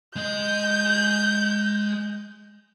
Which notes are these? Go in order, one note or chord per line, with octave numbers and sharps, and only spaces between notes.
G#3 D#5 G6